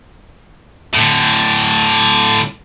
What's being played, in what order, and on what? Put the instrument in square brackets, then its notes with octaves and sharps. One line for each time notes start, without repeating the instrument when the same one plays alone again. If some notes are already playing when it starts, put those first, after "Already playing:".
[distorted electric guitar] A2 D3